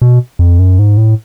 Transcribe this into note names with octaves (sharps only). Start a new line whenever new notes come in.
B2
F2
F#2
G#2
A2